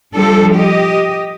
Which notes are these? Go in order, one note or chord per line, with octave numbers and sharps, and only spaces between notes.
F3 G3 D4 A4
G4 D#5